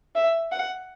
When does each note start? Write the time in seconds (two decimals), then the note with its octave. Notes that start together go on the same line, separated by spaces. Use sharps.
0.15 E5
0.52 F#5